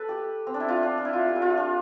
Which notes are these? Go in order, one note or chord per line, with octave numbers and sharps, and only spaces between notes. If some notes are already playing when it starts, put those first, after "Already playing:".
Already playing: A4 B4
G4
C4
D4
E4
F4
D4
D4
E4
F4
G4
E4
F4
D4